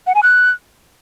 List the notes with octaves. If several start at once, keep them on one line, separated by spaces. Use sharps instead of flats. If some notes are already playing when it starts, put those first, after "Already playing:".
F#5
G#5
F#6